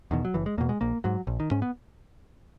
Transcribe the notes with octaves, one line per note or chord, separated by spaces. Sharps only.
E2 B2 D#3
F#3
F#1 E3
G#3
E2 B2 A#3
G#3
A#1 A#3
G#2 F#3
A#1
D#3
G#2 C#4
B3